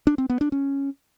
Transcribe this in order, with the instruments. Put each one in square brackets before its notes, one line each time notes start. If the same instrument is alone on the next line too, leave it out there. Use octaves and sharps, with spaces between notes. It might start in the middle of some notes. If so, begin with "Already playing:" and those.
[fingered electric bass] D4
C4
B3
D4
C#4